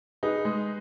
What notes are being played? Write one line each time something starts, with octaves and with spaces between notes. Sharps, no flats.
D#4 G#4 B4
G#3